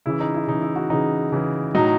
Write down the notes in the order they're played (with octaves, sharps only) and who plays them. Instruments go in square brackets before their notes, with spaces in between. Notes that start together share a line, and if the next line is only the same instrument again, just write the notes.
[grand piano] C#3 E3 E4
D#4
E4
C#3 E3 D#4
E4
F#4
C#3 E3 D#4
C#3 E3
A2 F#3 D#4